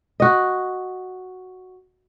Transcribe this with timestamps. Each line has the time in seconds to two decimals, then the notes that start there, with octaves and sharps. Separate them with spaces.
0.20 F#4 D#5